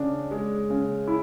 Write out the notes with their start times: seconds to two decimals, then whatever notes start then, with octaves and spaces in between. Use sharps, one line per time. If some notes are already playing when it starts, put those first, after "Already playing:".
Already playing: C#3 D4
0.31 G#3
0.70 C#3
1.07 E4